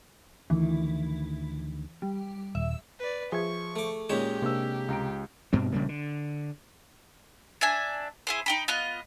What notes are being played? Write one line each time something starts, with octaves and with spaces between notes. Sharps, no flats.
D2 D#3 E3
G3
D#1 E5
B4 D5
F3 G#4 E5 C#6 G#6
A3 D6
A#2 G#3 C#4 D#4 G4 C#5 E7
C3 A#3 D4 E6
C#2 A#5 D7
G2 B2 C4
A#1 C#3 G3 A#3
D3
D4 E5 G#5
E4 G#4 C5
D#4 G5 B5
B3 F4 D#5 F#6